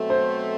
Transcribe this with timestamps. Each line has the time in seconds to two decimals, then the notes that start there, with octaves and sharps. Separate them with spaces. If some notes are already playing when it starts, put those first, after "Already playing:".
Already playing: B2 F#3 A3 C4
0.10 C5